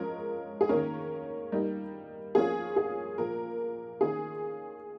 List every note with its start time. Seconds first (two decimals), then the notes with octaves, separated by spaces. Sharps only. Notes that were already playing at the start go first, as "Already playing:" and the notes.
Already playing: F3 G#3 C#4 F4 A#4
0.61 G#4
0.69 D#3 A#3 C#4 A#4
1.52 G3 A#3 D#4
2.35 F3 A#3 C#4 F4 G#4
2.76 G#4
3.18 A#2 F3 A#3 A#4
4.01 D#3 A#3 C#4 F4 G#4